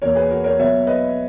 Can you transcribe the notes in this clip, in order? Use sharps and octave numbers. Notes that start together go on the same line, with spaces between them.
E2 B2 A#3 A#4 C#5
G#4 B4
F#4 A#4
A#4 C#5
B2 F#3 B3 C#5 E5
B4 D#5